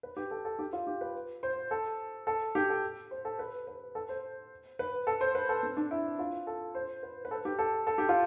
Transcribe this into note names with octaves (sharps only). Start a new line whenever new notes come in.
B4
G4
A4
A4
G4
F4
G4
B4
C5
A4
A4
G4
A4
C5
A4
B4
B4
A4
C5
B4
A4
C5
B4
A4
C4
D4
E4
F4
A4
C5
B4
B4
A4
G4
A4
A4
G4
F4